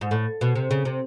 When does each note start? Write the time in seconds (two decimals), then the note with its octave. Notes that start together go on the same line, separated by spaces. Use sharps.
0.01 G#2
0.11 A2
0.41 B2
0.55 C3
0.71 C#3
0.85 C3